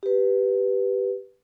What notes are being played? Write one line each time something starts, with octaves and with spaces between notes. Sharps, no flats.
G4 B4